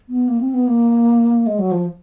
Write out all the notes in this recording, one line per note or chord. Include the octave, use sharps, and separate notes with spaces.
B3
A#3
C4
B3
A#3
G#3
F#3
F3